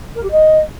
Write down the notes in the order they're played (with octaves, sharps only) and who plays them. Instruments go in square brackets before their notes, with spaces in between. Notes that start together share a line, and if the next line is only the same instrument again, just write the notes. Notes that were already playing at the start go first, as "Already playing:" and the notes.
[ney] A#4
G4
D#5